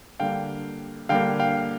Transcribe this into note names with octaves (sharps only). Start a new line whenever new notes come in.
D3 G3 A#3 F5 G5
D3 G3 A#3 F5 G5
F5 G5